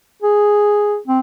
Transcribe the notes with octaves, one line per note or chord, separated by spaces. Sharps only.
G#4
C4